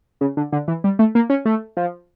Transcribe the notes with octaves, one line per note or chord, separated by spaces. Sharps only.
C#3
D3
D3
E3
G3
A3
A#3
C#4
A3
F3